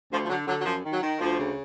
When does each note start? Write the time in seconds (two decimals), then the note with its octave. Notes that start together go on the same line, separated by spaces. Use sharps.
0.12 D2 F3
0.24 F3
0.30 D3 F#3
0.47 D3 F#3
0.61 F#3
0.65 F#2 F3
0.84 D#3
0.93 F#3
1.02 D#3
1.19 D2 F3
1.38 C#3